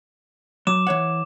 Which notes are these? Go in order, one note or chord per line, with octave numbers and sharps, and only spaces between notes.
F#3 D6 E7
E3 C#5 F#5